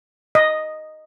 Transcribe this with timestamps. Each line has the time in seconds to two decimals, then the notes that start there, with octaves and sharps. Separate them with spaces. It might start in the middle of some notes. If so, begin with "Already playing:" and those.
0.35 D#5